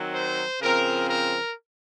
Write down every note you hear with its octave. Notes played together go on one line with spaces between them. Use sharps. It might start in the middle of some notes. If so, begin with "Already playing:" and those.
Already playing: D#3 F#3 C4
C5
C#3 F3 C4 A#4
A#4